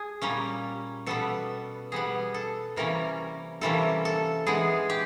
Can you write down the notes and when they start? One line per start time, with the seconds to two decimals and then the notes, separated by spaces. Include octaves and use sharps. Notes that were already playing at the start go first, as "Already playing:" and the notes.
Already playing: G#4
0.22 A#2 G3 A#3 C#4
1.06 B2 G3 B3 A4
1.92 B2 G3 B3 G#4
2.34 A4
2.76 C3 E3 G3 A#3 C#4 A#4
3.61 C3 E3 G3 A#3 C#4 A4
4.05 A4
4.47 E3 G#3 B3 G#4
4.90 G4